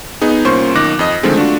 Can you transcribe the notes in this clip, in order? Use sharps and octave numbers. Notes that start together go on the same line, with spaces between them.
B3 D#4 G#4
C2 A#3 C#4 F4 C5 C#6
B1 D#3 D#4 D6 F#6 A#6
F2 D#5
D3 D#3 F3 G#3 A3 C4
A3 D4 F4 F#4